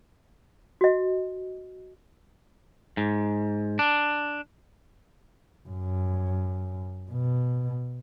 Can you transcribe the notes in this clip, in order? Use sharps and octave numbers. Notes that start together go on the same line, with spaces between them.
F#4 D#5
G#2
D4
F#2
B2